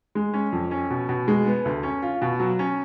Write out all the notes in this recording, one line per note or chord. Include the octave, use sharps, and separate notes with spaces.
G#3
C#4
F2
C#4
B2
B2
G#3
B3
D2
C#4
F4
B2
F#3
C#4